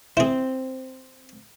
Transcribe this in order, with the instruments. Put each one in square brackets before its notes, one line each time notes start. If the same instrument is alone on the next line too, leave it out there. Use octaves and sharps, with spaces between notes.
[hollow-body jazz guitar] C4 C5 [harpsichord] E4 G#4